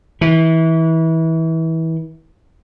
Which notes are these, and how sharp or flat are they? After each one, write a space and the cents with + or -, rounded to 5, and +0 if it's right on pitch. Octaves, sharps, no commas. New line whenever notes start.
E3 -25